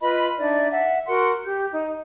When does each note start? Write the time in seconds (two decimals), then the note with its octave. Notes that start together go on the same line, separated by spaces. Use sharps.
0.01 F4 B4 D#5 B5
0.38 D4 D#4 D5 E5
0.71 E5 F#5
1.06 F#4 A#4 F#5 C6
1.44 G4 G6
1.70 D#4